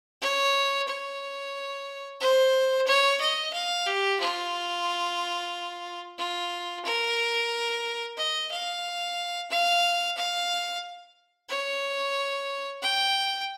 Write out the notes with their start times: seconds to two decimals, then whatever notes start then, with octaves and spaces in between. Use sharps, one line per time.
0.22 C#5
0.88 C#5
2.21 C5
2.87 C#5
3.21 D#5
3.53 F5
3.86 G4
4.20 F4
6.18 F4
6.85 A#4
8.18 D#5
8.51 F5
9.50 F5
10.17 F5
11.49 C#5
12.82 G5